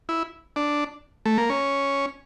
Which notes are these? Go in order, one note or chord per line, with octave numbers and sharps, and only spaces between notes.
E4
D4
A3
A#3
C#4